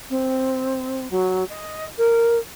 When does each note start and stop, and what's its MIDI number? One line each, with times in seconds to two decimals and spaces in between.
0.10 1.10 60
1.10 1.44 54
1.49 1.85 75
1.98 2.38 70